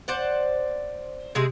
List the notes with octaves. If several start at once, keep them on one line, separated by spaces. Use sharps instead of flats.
C5 D5 F#5
C3 G#3 G#4